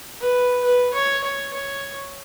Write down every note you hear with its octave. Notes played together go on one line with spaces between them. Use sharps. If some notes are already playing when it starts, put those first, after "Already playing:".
B4
B4
C#5
C#5
C#5